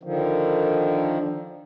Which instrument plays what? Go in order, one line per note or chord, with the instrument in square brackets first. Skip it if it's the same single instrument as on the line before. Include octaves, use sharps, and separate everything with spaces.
[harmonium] D3 D#3 F3